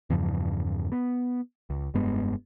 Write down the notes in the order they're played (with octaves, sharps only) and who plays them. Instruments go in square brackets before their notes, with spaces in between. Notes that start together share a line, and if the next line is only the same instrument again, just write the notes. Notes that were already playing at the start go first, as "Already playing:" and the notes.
[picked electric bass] E2 G2 C#3 F3
B3
C#2
F1 G2 G#3 B3